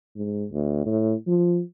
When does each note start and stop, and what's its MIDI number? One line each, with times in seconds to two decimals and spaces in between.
0.16 0.45 44
0.52 0.85 38
0.86 1.14 45
1.27 1.61 53